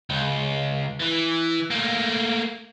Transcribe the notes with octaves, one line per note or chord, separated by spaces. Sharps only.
C#2
E3
A3 A#3